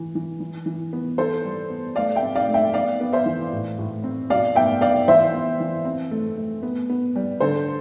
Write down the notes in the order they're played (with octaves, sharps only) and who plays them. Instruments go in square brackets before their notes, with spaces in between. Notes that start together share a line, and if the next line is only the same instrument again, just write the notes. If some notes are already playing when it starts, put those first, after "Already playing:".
Already playing: [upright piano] E3
E3
E3
E3
B3
E3 A4 C5
G3
B3
A3 D5 F5
E5 G5
C4
D5 F5
A3
E5 G5
B3 D5 F5
B3
C5 E5
E3
A2
A2
C4
B2 D5 F5
B3 E5 G5
B3 D5 F5
E3 C5 E5
B3
E3
C4
A3
A3
B3
B3
G3
D3 A4 C5